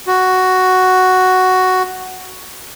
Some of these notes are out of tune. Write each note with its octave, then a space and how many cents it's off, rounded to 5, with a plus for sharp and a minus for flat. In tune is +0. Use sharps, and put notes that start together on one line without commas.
F#4 +5